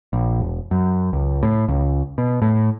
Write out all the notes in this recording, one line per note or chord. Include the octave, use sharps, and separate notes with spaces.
A#1
E1
F#2
C#2
A2
C#2
B2
A2